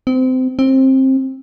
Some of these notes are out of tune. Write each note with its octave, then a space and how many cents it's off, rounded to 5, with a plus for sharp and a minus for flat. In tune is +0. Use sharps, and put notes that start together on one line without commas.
C4 -25
C4 +20